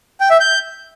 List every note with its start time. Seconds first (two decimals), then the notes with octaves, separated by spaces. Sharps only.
0.20 G5
0.30 E5
0.40 G6